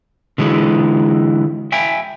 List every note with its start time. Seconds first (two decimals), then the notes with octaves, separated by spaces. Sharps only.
0.38 D3 E3 G#3
1.72 E5 G5 G#5